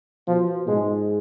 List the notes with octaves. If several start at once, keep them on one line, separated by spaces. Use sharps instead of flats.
B2 F3
G#2 G#3